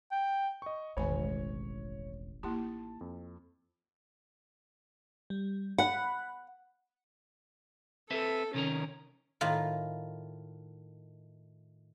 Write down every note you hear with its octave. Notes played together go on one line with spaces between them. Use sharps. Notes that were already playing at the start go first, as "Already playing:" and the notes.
G5
D#5 C#6
E1 A1 D#3 C4 C#5 G#5
A#3 D#4 E4 G4 A5
F2
G3
F#5 B5 F#6
C4 A4 B4 E5
C3 D#3 C#4 A#4
A2 D#3 F4